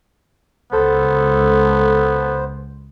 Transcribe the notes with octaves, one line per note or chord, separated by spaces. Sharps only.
C#2 B3 A4 C5